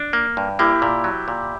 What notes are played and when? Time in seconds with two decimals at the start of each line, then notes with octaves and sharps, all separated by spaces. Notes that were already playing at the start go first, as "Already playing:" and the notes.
Already playing: D4
0.13 A#3
0.37 G2
0.59 A#3 E4 G4
0.82 A#2
1.04 F#3
1.28 A#2